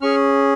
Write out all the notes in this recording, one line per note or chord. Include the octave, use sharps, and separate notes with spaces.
C#4 G#4 C#6 F6